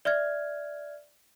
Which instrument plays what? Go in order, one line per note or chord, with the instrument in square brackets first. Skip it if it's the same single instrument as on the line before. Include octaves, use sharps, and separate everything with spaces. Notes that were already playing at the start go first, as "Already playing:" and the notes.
[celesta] D5 E5 F6 G#6